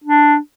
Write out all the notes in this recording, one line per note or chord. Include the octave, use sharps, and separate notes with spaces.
D4